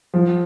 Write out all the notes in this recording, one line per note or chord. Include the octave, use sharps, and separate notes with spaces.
F3